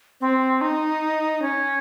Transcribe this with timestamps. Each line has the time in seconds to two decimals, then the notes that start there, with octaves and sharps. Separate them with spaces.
0.21 C4
0.61 D#4
1.42 C#4